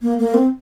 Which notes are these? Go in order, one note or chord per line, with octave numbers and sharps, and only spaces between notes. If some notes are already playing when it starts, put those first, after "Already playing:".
A#3
A#3
C4